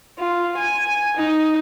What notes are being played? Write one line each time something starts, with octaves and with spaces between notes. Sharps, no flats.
F4
G#5
D#4